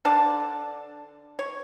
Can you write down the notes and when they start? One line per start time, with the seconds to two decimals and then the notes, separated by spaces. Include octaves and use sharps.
0.05 D3 D4 D5 A5
1.39 C#5